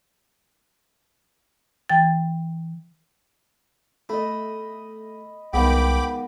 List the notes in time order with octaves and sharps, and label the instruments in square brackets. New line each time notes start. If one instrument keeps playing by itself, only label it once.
[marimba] E3 G5 A6
[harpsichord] A3 [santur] D#5 B5
[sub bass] C2 [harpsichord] D#3 F3 G#3 [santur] B3 [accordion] G5 B5 D6